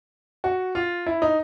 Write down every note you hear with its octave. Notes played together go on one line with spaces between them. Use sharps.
F#4
F4
E4
D#4